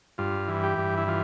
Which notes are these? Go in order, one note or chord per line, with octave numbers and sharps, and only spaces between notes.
G2 F4
E3
G4
G2
E4
E3 F4